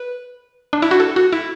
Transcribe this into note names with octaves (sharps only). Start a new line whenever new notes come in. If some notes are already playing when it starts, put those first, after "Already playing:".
Already playing: B4
D4
E4
F#4
A4
F#4
E4